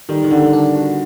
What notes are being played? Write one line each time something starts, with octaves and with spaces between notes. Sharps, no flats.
D#3 G3
D#3
D3 G3
D4
F#4